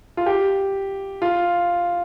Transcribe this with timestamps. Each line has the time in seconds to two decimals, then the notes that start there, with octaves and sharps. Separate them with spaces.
0.17 F4
0.26 G4
1.22 F4